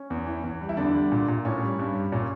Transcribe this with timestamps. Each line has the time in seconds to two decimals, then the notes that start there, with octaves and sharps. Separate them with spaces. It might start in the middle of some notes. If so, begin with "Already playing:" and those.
Already playing: C#4
0.10 E2
0.27 E3
0.44 E2
0.61 G3
0.69 E4
0.77 E2 D3 D4
0.94 G3
1.12 A#2
1.28 A#2
1.45 A2 C#4
1.61 G3
1.79 G2
1.95 G3
2.12 A#2 C#4